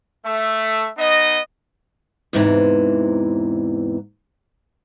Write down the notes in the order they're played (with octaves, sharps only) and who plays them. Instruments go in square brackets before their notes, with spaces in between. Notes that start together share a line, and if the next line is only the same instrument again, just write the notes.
[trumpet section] A3 E5
B3 D#4 D#5
[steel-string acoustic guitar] E2 G#2 C3 E3